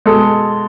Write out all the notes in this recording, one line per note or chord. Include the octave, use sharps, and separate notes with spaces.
B2 G#3 A4